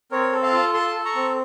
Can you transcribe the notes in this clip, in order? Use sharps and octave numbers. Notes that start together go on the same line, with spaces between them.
C4 A#4 C#5
A4
F5 A5
F4
A4 A5 C6
A4
A#5 C#6
C4